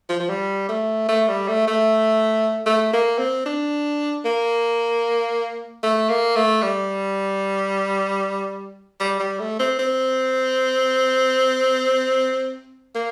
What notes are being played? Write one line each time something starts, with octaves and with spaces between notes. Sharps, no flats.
F3
F3
G3
A3
A3
G3
A3
A3
A3
A#3
C4
D4
A#3
A3
A#3
A3
G3
G3
G3
A3
C4
C4
A#3